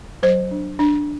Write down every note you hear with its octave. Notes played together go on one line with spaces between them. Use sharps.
F#3 C5
D4
D4